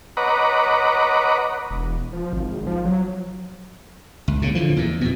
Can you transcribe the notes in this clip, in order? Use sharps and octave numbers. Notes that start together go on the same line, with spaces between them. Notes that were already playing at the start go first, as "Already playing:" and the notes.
B4 C#5 D#5 F#5 A#5 D6
E1
F3
G#1
F3
F#3
C#2
A#2 C#3
D3 E3 F3
E2 A#2
F2 B2